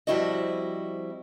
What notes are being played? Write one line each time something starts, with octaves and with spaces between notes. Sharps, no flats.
F3 G3 C4 E4 F#4 D#5